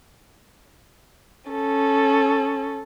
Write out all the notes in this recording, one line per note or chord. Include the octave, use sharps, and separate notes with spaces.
C#4 A4